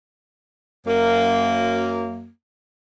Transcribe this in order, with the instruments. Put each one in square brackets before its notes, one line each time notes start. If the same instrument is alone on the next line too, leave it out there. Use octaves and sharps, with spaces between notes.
[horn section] F#2 A#3